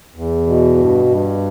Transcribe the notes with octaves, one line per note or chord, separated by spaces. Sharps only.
E2
B2
G2
G2